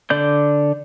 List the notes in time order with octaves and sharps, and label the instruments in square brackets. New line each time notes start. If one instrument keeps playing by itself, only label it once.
[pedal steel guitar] D3 D5 G6